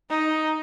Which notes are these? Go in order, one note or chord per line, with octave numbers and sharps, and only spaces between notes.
D#4